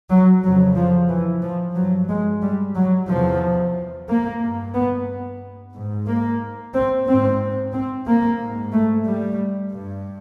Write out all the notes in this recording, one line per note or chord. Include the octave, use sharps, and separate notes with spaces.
F#3
F2 C#3 F#3
F3
E3
F3
G2 F#3
G#3
G3
F#3
E2 C3 F3
A#3
G2
B3
G#2
A#3
C4
G#2 C4
C4
A#3
G#2
A3
G3
G2